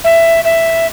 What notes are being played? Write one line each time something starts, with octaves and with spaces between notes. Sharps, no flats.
E5
E5